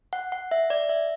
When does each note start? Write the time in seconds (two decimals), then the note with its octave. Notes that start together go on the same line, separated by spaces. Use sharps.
0.13 F#5
0.32 F#5
0.51 E5
0.70 D5
0.89 E5